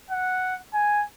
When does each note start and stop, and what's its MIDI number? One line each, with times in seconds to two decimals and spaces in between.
0.11 0.57 78
0.74 1.04 80